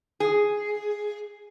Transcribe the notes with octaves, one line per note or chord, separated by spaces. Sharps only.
G#4